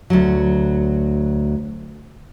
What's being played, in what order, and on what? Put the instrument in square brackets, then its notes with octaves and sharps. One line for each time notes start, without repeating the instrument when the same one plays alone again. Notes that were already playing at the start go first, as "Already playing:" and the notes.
[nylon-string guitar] D2 F#3